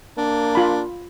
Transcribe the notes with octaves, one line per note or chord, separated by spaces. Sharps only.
A#3 D4
F4 B5